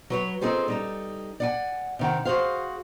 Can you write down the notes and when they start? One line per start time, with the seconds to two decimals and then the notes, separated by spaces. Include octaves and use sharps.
0.10 F#3 B4 C#5
0.41 C4 D#4 F4 G#4 A4 C5
0.68 G3 D#4 A4
1.40 D5 F#5 G#5
1.99 C3 D#3 F#5
2.25 F#4 G#4 C5 F5